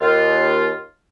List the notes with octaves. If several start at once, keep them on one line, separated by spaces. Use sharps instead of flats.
D#2 F4